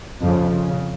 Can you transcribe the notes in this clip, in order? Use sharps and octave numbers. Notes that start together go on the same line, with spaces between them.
F2 C#3 F3
C#3